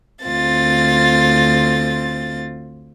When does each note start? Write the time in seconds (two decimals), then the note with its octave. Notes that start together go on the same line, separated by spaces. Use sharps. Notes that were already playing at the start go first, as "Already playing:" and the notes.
0.23 D2 C4 F4 A6